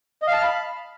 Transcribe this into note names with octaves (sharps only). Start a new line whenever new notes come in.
D#5
F5
A5
F6
B5